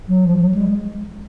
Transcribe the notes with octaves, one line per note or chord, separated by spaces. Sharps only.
F#3
F3
F#3
G#3